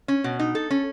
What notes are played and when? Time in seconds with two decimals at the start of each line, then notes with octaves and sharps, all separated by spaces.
0.08 C#4
0.24 B2
0.39 D#4
0.55 A4
0.70 C#4